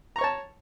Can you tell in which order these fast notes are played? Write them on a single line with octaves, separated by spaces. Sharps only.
A#5 C#6 C#5 A5